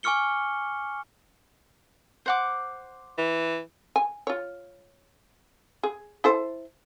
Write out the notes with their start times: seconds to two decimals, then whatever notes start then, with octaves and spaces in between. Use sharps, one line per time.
0.03 G#5 C#6 D6 F6 C#7 G7
2.26 C5 F#5 D6
3.18 E3
3.96 G#5
4.27 F4 C#5
5.83 G#4
6.24 E4 A4 C5